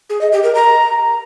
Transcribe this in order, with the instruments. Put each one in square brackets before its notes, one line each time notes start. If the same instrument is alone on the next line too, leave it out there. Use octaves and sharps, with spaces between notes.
[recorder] G#4
D#5
G4
A#4
A#5